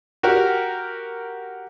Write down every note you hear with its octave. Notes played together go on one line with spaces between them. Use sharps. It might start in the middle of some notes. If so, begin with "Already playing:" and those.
F#4 G4 A#4